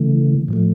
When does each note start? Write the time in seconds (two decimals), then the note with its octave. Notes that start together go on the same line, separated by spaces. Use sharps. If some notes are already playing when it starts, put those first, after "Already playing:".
Already playing: C#3 E3 A3
0.48 A2 F3 A3